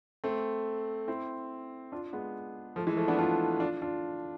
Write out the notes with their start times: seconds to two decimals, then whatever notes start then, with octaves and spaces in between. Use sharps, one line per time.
0.24 A3 C4
1.08 C4 E4
1.92 D4 F4
2.13 G#3 B3
2.76 F3 A3
2.87 E3 G#3
2.97 F3 A3
3.08 B3 D4
3.19 D4 F4
3.60 D4 F4
3.82 D4 F4